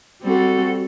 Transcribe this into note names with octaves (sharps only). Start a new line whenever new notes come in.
G3 C4 F#4 A4